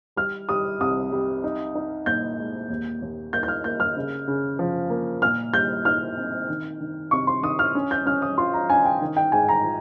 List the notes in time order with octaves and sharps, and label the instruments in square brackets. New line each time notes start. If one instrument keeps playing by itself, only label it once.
[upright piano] G3 [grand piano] F6
[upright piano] G3 [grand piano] D#6
[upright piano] C2 [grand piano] D#6
[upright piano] G3
D#4
D#4
[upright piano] A#2 [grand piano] G6
[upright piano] G#3
D#2
D#2
[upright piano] A#3 [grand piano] G6
[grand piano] G6
F6
[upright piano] A#3 [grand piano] G6
[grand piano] F6
[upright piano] C#3
C#3
F3
A#3
[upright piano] A#2 [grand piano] F6
[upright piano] G3 [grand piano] G6
[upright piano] D#4 [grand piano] F6
[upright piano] C4
D#3
D#3
[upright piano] C3 [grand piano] C#6
[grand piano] C6
[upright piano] D#3 [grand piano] D#6
[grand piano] F6
[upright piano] C#4
[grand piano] G6
[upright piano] C#4 [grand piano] F6
[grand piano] D#6
[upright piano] F4 [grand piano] C6
[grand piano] A#5
[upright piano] C#4 [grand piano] G#5
[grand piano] G5
[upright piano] D#3
[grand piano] G5
[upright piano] G#2 [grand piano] G#5
[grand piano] A#5
[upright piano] F4